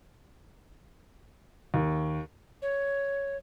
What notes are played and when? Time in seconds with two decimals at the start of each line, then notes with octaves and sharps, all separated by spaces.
1.74 D#2
2.62 C#5